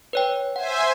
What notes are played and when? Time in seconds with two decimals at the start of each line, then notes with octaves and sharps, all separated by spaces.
0.13 B4 C#5 G5
0.56 C5 E5 F#5 G#5